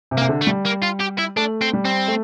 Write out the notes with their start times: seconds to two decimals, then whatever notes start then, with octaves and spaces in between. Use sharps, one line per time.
0.11 C3
0.17 A#3
0.22 C3
0.29 D3
0.41 A3
0.47 G3
0.66 A#3
0.83 F4
1.01 G4
1.19 E4
1.36 A3 D4
1.61 C4
1.73 G3
1.85 C4
2.08 A3